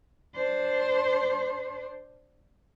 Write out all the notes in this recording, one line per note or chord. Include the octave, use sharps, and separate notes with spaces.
D4 C5